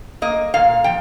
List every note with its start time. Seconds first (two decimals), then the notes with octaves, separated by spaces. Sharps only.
0.22 A#3 D#5
0.54 A#2 F5
0.84 F3 G5